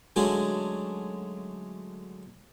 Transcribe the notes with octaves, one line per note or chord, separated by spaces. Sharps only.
D3 F#3 G#3 A3 C#4 D4